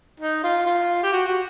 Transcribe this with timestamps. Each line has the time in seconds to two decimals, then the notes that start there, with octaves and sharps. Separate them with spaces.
0.20 D#4
0.44 F4
0.66 F4
1.03 G4
1.13 F#4
1.28 F#4